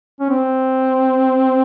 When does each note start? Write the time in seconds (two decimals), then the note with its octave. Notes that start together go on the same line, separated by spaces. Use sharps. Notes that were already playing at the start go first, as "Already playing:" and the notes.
0.20 C#4
0.30 C4